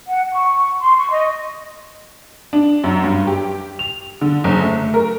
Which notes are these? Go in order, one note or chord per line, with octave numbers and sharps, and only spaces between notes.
F#5
C#6
C6
C#6
D#5
D4
F#2
G2
G4
F7
D3
F#1
A3
A#4